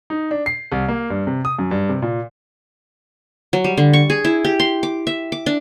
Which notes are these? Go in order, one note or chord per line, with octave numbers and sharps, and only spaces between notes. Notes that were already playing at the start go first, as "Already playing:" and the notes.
D#4
D4
C7
C2
A#3
G2
C3
D#6
F#2
G2
C3
A#2
F#3
G3
D3
C#6
G#4
E4
G4
C6
D6
E5
D6
D4